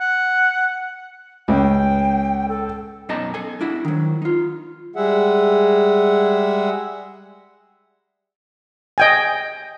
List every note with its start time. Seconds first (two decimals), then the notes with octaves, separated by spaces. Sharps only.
0.01 F#5
1.48 C#2 G5
2.48 A4
3.09 F#2 B2 D#4 D#5 A5 A#5
3.34 A4 G#5
3.61 D4 E4 F#4
3.85 D#3 F#3
4.22 D#4 F4
4.96 G3 G#3 G#4 E5 F#5
8.98 D#5 G5 G#5